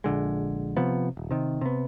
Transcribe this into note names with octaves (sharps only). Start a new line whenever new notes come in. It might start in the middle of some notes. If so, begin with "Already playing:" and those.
A#1 D3 G#3
C3 F3 B3
D#1
C3 D#3
C3 B3